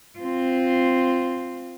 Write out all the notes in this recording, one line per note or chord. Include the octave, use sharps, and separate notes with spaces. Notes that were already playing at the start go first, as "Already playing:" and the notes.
C4 F4